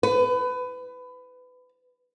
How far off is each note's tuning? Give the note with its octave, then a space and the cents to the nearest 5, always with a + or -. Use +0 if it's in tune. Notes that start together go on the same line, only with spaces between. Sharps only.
B4 +25